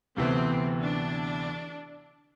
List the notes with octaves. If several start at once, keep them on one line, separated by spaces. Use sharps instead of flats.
D2 C3 E3 B3 C4 E4
D4